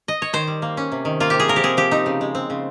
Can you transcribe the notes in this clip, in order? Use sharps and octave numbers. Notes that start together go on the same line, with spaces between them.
D#5
C#5
D#3 C5
G3
A#3
C#4
C3
D#3
A#3 F4
C3 G4
G#4
F3 A#4
G4
C4 G#4
F3 G4
C4 D#4
C#3
G#3
C4
C#3